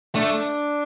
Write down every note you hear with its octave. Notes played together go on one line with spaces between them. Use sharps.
A3 D4